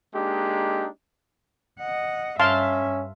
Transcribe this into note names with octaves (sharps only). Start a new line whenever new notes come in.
G#3 A#3 D4 D#4 G4
D#5 F#5
G2 C#4 E5 F5 A5 C6